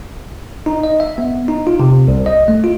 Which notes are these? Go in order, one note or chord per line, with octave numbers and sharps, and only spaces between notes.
D#4
D#5
E5
B3
D#4
F4
C3
C2
D#5
A3
F4